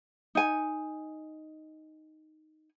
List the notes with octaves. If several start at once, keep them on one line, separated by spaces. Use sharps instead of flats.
D#4 G#5